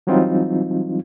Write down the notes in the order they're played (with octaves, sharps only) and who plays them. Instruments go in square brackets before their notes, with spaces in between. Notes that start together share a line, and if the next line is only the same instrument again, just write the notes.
[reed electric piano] E3 F#3 G3 C4 D#4 F4